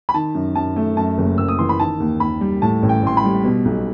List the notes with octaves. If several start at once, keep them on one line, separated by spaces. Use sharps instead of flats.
B5
D#3 A5
F#2
F#2 A5
A3
F#2 A5
F#1
F#1 E6
D#6
E3 C6
B5
D#3 A5
D#2
D#2 B5
G3
A2 A5
A1
G5
A1 C6
B5
G3
B2
B1